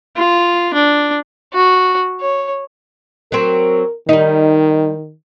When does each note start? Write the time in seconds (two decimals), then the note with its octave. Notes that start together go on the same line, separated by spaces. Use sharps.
0.16 F4
0.74 D4
1.53 F#4
2.20 C#5
3.32 F#3 C4 A#4
4.09 D#3 G3 D#4